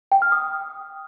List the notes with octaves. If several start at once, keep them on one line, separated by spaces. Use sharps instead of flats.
G5
F6
D#6